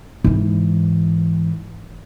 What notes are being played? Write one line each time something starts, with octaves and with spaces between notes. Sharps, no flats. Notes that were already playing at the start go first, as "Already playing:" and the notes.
G#2 E3